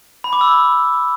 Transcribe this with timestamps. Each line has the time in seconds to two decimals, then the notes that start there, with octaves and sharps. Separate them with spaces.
0.24 B5
0.33 D6
0.41 E6